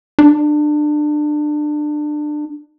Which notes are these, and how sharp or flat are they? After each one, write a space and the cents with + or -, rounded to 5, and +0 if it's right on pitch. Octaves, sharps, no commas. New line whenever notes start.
D4 +25